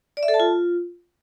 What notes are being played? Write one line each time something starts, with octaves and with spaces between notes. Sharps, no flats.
D5
E5
A4
A5
F4